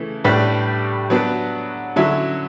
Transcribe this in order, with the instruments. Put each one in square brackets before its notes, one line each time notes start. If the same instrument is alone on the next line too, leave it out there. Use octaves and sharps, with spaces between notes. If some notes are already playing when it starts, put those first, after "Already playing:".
Already playing: [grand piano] C#3 E3 A3
A2 G3 D4 G4 B4
F#3 B3 D4
D3 F#3 C#4 E4